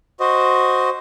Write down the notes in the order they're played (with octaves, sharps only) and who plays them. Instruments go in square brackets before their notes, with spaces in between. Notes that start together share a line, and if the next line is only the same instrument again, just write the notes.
[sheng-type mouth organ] F#4 C5 D#5